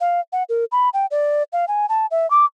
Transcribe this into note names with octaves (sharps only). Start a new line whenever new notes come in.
F5
F#5
A#4
B5
G5
D5
F5
G#5
A5
E5
D6